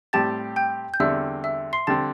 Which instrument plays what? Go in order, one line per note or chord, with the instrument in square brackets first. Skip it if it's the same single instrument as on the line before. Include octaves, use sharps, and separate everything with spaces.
[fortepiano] A2 G3 C4 G4 [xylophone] A5 A6
[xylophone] G5 G6
G6
[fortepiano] E2 D3 G3 C4 [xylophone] E5 E6
[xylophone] E5 E6
C6 C7
[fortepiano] D3 G3 C4 [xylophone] A5 A6